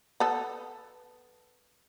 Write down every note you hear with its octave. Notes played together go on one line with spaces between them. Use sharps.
B3 A4